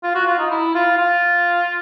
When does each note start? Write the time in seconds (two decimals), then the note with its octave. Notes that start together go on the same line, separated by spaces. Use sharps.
0.03 F4
0.15 F#4
0.27 F4
0.39 D#4
0.51 E4
0.75 F4
0.98 F4